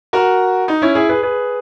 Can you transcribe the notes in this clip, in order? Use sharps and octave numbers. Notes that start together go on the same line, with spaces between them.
F#4 A#4
D#4
C#4 E4
E4 G#4
G#4 B4
G#4 B4